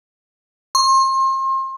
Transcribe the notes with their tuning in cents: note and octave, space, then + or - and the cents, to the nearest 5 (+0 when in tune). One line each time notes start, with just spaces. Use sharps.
C6 +35